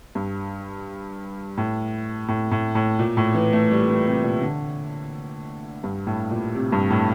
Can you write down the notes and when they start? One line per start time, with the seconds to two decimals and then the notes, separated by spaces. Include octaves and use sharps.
0.15 G2
1.57 A2
2.28 A2
2.51 A2
2.75 A2
2.99 A#2
3.17 A2
3.35 E3
3.53 A3
3.71 G3
3.89 E3
4.06 C3
4.23 A#2
4.41 D3
5.84 G2
6.07 A2
6.31 A#2
6.55 C3
6.72 G2
6.90 A2